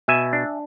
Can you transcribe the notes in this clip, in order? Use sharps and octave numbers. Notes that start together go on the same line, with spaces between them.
B2 E5 G#5
D4